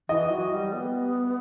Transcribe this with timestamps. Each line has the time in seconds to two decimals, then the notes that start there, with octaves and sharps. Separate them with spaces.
0.09 E3 D#5
0.30 F#3
0.51 G3
0.73 B3